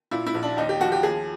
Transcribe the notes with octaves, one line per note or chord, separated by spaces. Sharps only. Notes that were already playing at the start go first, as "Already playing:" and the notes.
A#2 E4
E4
A#1
D4
D#2 D#4
G4
F3 F#4
G4
D#2 G#4